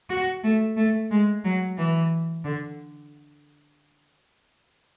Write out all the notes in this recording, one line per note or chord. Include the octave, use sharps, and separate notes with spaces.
F#4
A3
A3
G#3
F#3
E3
D3